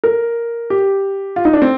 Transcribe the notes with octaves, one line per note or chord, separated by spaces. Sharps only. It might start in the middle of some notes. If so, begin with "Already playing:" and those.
A#4
G4
F4
D#4
D4
C4